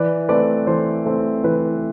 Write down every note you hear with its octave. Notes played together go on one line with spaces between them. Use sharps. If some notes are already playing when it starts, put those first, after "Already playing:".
Already playing: E3 B4 D5
A3 C4 B4 D5
E3 A4 C5
A3 C4
E3 B4